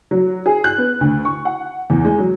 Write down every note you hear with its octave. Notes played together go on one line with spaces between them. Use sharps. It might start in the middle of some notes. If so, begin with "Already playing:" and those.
F#3
G#4
F#6
B3
D2
C#6
F#5
E2
G#3
F#3